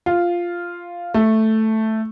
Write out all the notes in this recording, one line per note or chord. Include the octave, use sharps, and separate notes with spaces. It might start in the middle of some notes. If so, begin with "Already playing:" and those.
F4
A3